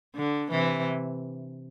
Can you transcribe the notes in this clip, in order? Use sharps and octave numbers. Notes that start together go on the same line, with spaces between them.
D3
C3 E3